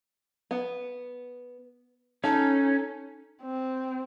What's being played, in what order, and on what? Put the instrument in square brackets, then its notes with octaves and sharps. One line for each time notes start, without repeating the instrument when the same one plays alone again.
[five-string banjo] B3
[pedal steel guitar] C#4 [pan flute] D#4 [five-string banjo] A4
[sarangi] C4